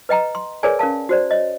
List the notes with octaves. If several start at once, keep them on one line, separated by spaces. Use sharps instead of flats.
B4 D#5 G5 A#5
C6
G#4 A#4 B4 C#5 D5 G#5
C#4 A#4 F5 A5
F#4 C5 D5
C#5 D#5